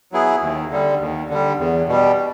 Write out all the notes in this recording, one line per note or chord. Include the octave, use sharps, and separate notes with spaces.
F#3 B3 E4 G#4
D#2
D3 G3
D#2
D3 G3
E2
B2 G3